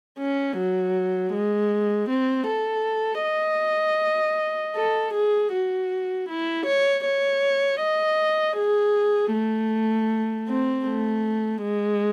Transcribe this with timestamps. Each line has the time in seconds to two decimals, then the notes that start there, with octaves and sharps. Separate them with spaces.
0.19 C#4
0.57 F#3
1.33 G#3
2.10 C4
2.48 A4
3.24 D#5
4.76 A4
5.14 G#4
5.53 F#4
6.29 E4
6.67 C#5
7.06 C#5
7.82 D#5
8.58 G#4
9.33 A3
10.48 C4
10.86 A3
11.62 G#3